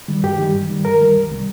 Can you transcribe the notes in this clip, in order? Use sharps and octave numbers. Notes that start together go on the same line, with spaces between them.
D#3 G3
G2 G4
D#3 G3
G2
D#3 G3
G2 A#4
D#3 G3
C2
C3 D#3 G3